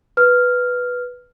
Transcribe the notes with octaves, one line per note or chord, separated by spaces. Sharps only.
B4 F6